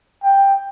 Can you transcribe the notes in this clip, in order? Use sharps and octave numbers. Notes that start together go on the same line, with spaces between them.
G5